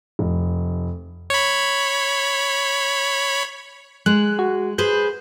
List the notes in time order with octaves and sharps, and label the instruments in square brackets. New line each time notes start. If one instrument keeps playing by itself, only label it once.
[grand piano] F1
[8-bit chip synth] C#5 B5
[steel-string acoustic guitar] G#3 [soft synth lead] F#6
[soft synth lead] F#4
[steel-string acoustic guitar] G#4 B4 C5 [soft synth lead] G6